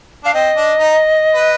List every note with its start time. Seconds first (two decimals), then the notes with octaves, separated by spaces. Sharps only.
0.24 D4 F5
0.34 C4 D#5
0.56 D4
0.79 D#4
1.34 B4